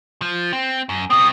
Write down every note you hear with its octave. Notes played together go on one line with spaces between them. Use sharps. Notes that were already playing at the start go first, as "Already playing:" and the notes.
F3
C4
F#2
B2 C4 D#6